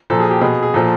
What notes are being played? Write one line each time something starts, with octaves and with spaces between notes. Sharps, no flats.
A#2 F3 A4
G#4
G4
B2 G#4
G#4
A#2 F3 A4